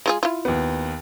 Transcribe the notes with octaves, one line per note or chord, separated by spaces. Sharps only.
G#3 F4 G#4
E4 F4
D#2 B3